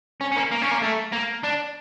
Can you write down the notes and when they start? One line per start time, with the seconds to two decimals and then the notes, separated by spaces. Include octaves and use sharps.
0.21 C#4
0.32 C#4
0.36 A#3
0.51 A#3
0.62 C#4
0.71 A#3
0.82 A3
1.12 A#3
1.43 D4